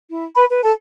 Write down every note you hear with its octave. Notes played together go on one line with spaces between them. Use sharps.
E4
B4 B5
B4
A4 A5